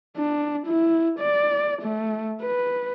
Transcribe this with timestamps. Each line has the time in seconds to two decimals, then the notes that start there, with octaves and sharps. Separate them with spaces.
0.17 D4
0.66 E4
1.19 D5
1.82 A3
2.42 B4